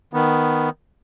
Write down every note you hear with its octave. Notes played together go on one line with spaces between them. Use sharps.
D#3 B3